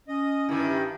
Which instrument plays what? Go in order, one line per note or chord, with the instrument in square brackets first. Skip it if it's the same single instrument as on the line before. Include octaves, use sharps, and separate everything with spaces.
[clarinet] C#4 [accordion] D#5
[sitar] G2 D#3 [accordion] E4